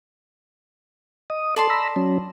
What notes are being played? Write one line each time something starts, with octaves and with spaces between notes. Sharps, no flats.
D#5 D#6
A4 D5 A5 C6
A#5 B5 E6
F#3 C#4